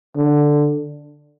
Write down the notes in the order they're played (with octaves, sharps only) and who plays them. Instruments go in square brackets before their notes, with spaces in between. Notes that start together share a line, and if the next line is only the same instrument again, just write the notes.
[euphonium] D3